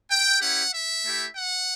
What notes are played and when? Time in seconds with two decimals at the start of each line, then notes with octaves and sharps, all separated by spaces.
0.10 G5
0.41 C#4 E4 G4 F#5
0.72 E5
1.04 A3 E4 G4
1.35 F#5